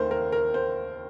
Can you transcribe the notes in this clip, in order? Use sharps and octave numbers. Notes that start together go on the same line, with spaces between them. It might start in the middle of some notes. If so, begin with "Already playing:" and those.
Already playing: D#2 D#3 A3 A#4 C5
A#4
A#4
C5